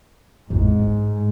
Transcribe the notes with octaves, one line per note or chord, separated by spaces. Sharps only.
A1 F2 G#2
G#3